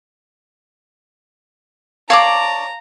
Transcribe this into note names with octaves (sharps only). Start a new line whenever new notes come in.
C#5 D5 F5 A5 A#5 D6